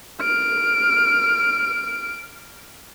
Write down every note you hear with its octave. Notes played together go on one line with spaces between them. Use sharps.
F6 D7